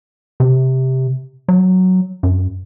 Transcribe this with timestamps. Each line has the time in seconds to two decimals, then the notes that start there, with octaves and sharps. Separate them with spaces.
0.40 C3
1.48 F#3
2.23 F#2